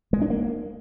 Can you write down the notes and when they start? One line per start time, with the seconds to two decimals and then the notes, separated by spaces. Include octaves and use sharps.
0.13 G#3
0.22 D4
0.30 A#3